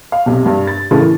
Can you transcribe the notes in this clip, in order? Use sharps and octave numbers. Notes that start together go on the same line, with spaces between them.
F5
B1 C3
G2
A6
A2 C#3 E3 A3
E3